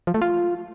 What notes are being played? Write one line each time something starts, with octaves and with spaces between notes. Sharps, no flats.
F3
A3
F4